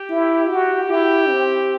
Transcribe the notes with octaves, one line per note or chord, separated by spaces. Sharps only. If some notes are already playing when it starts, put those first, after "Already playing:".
Already playing: G4
E4
F#4
E4 G4
C4